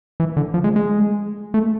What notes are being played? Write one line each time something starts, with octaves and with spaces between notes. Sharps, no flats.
E3
D3
F3
G#3
G#3
A3